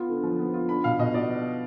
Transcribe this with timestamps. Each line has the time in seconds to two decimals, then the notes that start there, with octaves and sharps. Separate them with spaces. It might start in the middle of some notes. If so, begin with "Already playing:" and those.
Already playing: B3 F4
0.09 D3
0.24 F3
0.39 B3
0.54 F4
0.69 D4 B5
0.84 B2 F5
0.99 B2 D#5
1.14 B3 D5